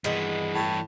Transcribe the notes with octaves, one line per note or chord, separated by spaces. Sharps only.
G2 D#3 E3 G#3 B3
A2